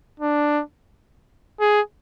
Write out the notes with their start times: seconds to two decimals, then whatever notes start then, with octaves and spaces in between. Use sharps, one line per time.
0.20 D4
1.60 G#4